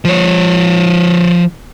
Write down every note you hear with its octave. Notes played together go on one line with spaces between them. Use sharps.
F3 C#5